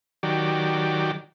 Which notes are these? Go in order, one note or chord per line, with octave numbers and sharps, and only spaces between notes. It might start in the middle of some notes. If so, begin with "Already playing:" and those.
D#3 F#3 G4 D5